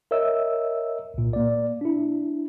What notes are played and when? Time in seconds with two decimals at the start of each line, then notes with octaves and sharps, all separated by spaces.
0.11 A#4 C#5 D#5 E5 E6
1.14 C2 A#2
1.33 A#3 D5
1.81 D4 E4